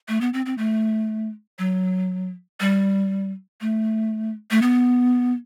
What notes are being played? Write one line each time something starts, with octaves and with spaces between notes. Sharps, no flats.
A3
B3
C4
C4
A3
F#3
G3
A3
A3
B3